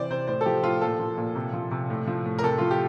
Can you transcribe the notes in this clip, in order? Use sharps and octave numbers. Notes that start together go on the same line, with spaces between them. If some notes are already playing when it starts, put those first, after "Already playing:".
Already playing: C3 E3 C5 D5
C3 C5
A2 C5
A4
F3 G4
A2 F4
A#2 A4
F3
A#2
C3
F3
C3
A2
F3
A2
A#4
C3 A4
F3 F4
G4